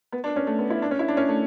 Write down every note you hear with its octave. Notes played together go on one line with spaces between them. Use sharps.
B3
D4
C#4
A3
B3
E4
D4
C#4
E4
D4
C#4
A3